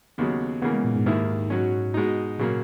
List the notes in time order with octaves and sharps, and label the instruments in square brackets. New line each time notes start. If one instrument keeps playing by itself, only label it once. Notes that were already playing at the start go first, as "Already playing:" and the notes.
[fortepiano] D#2 C#3 F#3 [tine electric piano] B3
[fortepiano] C#3 E3 A#3 [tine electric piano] B3
[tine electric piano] G#3
A#2
G#2
[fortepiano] D#2 D#3 A#3 E4 [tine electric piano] G#2
[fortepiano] B2 F#3 C#4
B2 G#3 D#4
[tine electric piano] A#2 [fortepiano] C#3 F#3 A#3